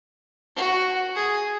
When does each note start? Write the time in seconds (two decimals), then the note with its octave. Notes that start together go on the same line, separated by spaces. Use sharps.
0.56 F#4
1.16 G#4